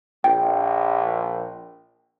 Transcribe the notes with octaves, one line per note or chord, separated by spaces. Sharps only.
A#1 G5